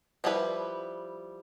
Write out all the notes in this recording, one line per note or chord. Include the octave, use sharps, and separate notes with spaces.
F3 G3 E4 G#4 B4